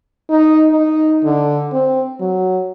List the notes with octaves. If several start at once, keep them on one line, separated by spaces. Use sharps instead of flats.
D#4
D#4
D3
C4
F#3